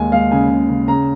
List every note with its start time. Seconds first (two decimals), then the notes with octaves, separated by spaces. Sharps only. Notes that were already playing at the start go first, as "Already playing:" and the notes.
Already playing: D#2 G#3 G#5
0.12 G#3 F5
0.31 C#3 G#5
0.50 C#3
0.69 C#3
0.88 C#3 A#5